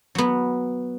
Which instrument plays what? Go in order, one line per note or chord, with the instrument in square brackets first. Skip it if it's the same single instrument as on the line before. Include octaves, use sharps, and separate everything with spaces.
[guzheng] F#3 B3